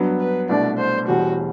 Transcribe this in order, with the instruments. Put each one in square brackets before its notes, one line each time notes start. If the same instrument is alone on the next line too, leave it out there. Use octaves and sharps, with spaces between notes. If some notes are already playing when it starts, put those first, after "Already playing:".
Already playing: [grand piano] G2 F#3 B3
[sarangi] B4
[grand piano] C2 B2 A3 D4 [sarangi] D5
[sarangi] C5
[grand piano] E1 E2 B2 G3 [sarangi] F#4